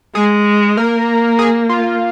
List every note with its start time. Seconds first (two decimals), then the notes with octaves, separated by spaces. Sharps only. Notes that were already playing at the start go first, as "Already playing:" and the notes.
0.15 G#3 G#4
0.77 A#3 A#4
1.39 G#4
1.69 F4